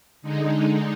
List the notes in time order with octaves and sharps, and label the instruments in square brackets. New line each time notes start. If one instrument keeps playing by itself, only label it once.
[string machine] D3 G#3 D#4